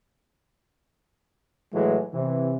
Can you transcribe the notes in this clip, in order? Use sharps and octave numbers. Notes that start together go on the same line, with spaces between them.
A2 E3 F#3 G#3 A3
C3 E3